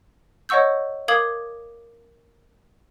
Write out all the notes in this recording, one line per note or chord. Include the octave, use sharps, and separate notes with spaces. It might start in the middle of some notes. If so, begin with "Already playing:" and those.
C#5 D#5 F#5 C#6 E6 G6
A#4 F5 D6 D#6 G#6 F#7